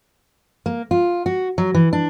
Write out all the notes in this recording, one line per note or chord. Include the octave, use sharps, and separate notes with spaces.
A#3
F4
F#4
F#3
E3
D4